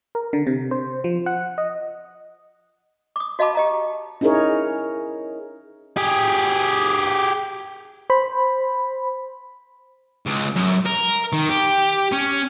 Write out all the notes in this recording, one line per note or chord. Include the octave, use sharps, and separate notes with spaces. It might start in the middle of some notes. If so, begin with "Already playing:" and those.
A#4
D3
C3
C5
F3
F#5
D#5
D6 D#6
F#4 D#5 F5 A5 B5 D6
G4 D#5 A#5
C#4 D#4 E4 G#4 A#4 C#5
G4 G#4
C5 B5
C#2
F#2
A#4
D#3
G4
C#4